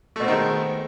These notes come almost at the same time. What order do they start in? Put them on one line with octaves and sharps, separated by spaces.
A3 B2 C4 D#3 G#3